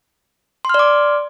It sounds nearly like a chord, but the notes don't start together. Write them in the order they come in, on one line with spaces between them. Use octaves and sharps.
C6 F6 D5 D6